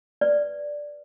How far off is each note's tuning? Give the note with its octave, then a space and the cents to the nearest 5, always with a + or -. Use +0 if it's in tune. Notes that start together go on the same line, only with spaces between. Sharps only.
B4 +0 D5 +0